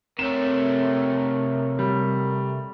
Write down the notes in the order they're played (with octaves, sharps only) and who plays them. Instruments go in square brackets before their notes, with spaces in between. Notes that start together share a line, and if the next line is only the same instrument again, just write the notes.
[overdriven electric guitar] C3 A3 [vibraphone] C4 C#5 [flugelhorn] A#4 [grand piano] E7
[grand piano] G3